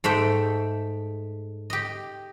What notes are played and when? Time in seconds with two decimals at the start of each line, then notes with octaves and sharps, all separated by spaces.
0.04 G#2 A3 E5 G5
1.70 G4 D#5